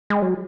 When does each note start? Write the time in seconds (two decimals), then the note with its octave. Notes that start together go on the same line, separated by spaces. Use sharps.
0.10 G#3
0.22 F#3